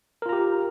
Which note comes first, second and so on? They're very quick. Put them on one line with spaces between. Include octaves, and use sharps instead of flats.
A#4 F4 A#5 G4